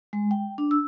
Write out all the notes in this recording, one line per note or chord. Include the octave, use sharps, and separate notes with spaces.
G#3
G5
D4
E6